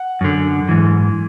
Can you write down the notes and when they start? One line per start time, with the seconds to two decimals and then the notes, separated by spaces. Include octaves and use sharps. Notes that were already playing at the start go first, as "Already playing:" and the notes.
Already playing: F#5
0.21 F#2 D3
0.69 G#2 E3